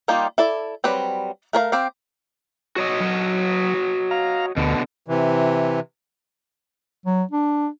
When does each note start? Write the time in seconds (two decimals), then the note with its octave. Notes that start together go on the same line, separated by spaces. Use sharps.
0.08 G3 A#3 D#4 F4 G4
0.38 E4 A4 D5
0.84 F#3 G3 C4 B4
1.53 A3 A#4 C#5 F5
1.72 C4 G4 F5
2.76 F#4 C#5 D#5
3.00 F#3
4.11 F5 A#5
4.57 D2 B2 D3
5.08 C3 E3
7.06 F#3
7.31 D4